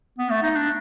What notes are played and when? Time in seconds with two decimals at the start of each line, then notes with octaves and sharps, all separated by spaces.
0.19 B3
0.30 A3
0.43 D#4
0.56 D4